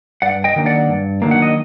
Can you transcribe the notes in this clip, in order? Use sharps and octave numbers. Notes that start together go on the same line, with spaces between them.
G2 D5 F#5
D#5 G5
D#3 F#3 A#3 D4
D5 F#5
G2
D#3 F#3 A#3 D4
F#5
D#5